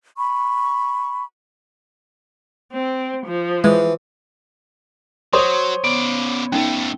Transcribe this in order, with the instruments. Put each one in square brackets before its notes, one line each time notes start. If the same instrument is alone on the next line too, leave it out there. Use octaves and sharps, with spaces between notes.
[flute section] B5 C#6
[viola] C4
F3
[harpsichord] E3 [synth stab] G#3
[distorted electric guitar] F#3 [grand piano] C5 C#5 D#6 [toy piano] C6
[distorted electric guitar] C#3 D5 [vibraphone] B3
[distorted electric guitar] F2 A3 [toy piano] C#4 D#4